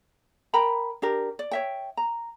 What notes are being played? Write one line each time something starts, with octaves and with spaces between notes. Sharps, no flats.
A#4 G5 A#5 B5
D4 G4 A#4
D5
C#5 E5 G5
A#5